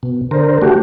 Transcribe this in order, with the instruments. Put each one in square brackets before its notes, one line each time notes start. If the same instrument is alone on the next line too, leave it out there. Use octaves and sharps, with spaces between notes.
[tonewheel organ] B2
D3 A#4 C5
A3 F#4 G4